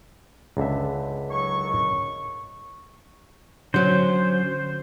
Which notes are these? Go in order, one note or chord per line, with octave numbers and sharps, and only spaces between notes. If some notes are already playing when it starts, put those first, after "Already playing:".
C#2 D3 E5
D#3 F#3 C#6
D3 F#3 C#4 C5